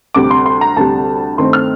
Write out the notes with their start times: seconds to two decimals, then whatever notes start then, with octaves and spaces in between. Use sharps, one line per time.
0.14 D2 C3 G3 D6
0.31 C6
0.46 C6
0.61 A#5
0.77 D2 C3 G3 A5
1.38 G2 D#3 A3 C4 C6
1.53 F6